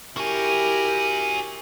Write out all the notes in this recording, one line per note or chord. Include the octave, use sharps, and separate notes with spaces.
E4 F#4 G4 A#4 G#5